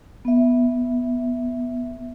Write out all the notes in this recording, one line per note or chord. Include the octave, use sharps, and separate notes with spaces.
B3 E5